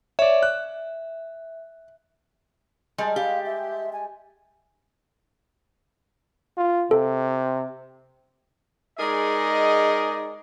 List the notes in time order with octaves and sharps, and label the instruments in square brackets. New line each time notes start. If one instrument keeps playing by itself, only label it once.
[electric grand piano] C#5 D5 [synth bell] E5
[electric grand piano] F#6
[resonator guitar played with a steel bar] G3 [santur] G#3 G5 A5
[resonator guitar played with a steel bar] G4 [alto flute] F5
[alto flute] E5
G#5
[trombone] F4
[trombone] C3 [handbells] A4
[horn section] G#3 D#4 G#4 A#4 D5 D#5